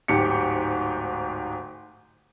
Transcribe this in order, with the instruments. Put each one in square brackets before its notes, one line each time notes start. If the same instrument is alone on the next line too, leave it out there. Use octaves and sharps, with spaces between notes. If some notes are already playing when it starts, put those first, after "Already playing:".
[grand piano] D1 G#2 G4 C#7